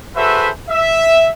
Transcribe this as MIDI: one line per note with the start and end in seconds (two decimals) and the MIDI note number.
0.16 0.50 66
0.16 0.50 68
0.16 0.50 69
0.16 0.50 71
0.16 0.50 72
0.16 0.50 76
0.69 1.30 76